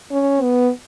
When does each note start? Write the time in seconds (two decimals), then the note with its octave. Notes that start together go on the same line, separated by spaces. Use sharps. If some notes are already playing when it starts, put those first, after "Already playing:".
0.11 C#4
0.42 B3